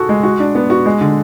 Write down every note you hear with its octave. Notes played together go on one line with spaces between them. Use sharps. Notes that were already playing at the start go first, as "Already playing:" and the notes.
Already playing: F#4 G#4 A4
G#3
F#4
D4
B3
F#4
G#3
D3